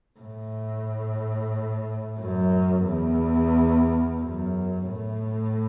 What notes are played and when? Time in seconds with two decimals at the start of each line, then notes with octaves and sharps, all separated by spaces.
0.19 A2
2.20 F#2
2.87 E2
4.22 F#2
4.89 A2